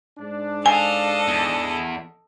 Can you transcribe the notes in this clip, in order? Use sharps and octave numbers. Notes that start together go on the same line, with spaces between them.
G#2 G#3 D4
A4 D#5 F5 G#5
E2